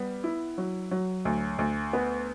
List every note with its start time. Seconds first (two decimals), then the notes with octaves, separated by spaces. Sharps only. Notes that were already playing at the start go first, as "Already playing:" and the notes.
Already playing: G3 B3
0.24 E4
0.58 F#3
0.91 F#3
1.25 D2
1.59 D2
1.93 B3